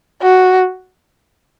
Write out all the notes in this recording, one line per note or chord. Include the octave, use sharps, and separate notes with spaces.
F#4